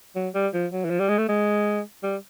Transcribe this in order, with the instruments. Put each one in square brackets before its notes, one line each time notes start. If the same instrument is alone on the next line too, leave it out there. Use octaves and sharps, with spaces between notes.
[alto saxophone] F#3
G3
F3
F#3
E3
F3
G3
G#3
A3
G#3
G3